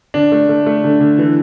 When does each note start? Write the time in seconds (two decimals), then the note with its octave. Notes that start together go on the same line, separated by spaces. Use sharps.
0.14 D3 D4
0.32 A3
0.49 A3
0.66 A3
0.84 D3
1.00 D3
1.19 E3